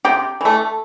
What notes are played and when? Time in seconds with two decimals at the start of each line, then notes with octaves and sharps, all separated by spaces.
0.05 C3 G4
0.41 E3 A3